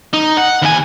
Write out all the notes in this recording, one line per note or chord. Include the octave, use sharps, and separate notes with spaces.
D#4
F#5
D#2 G#5